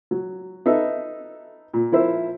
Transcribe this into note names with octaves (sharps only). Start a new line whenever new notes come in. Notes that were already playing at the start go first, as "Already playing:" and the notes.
F#3
D#4 A4 B4 E5
A#2
F3 E4 A#4 C5 E5